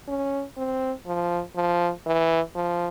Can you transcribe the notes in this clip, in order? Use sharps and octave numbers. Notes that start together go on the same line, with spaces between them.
C#4
C4
F3
F3
E3
F3